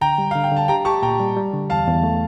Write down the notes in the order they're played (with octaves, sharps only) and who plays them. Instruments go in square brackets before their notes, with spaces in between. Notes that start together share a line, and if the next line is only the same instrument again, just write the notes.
[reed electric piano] D3 [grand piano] G5 A#5
[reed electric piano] G3
[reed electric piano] D3 [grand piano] F5
[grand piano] G5
[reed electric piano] D3 [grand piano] A5
[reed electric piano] G4 [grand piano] G5 A#5
[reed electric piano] G4 [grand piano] A5 C#6
[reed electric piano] A#2 [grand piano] G5 A#5
[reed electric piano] G3
G3
D3
[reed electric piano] E2 [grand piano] F5 A5
[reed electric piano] E2
A3